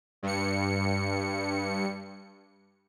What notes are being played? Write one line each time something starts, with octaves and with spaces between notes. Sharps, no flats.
G2 C#7